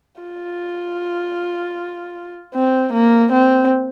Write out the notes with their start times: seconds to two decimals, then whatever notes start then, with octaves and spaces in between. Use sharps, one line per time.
0.21 F4
2.54 C4
2.93 A#3
3.32 C4